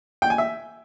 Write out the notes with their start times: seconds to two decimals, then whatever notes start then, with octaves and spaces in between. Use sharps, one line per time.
0.22 G5
0.30 G#5
0.38 E5